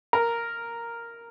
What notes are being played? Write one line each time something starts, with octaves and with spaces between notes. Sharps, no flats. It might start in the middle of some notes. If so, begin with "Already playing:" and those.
A#4